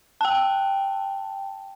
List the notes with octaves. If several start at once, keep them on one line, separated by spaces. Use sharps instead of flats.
G5 A5